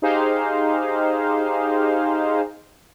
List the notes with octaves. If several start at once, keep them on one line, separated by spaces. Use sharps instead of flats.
D#4 G4 G#4 C5 F5